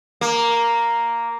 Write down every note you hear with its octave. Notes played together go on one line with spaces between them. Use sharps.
A#3